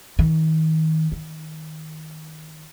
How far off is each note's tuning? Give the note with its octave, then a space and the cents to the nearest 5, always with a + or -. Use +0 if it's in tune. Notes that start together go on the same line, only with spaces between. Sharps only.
D#3 +35
D#3 +10